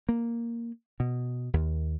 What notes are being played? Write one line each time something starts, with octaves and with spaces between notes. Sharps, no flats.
A#3
B2
D#2